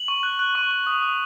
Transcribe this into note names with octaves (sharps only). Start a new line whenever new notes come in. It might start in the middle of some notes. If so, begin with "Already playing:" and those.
Already playing: F#7
C#6
F#6
F#6
C#6
F#6
D#6
D#6